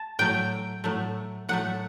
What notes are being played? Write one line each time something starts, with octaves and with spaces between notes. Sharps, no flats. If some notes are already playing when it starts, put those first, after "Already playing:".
Already playing: A5
A2 F#3 A3 G5
A2 F#3 A3
A2 F#3 A3 F#5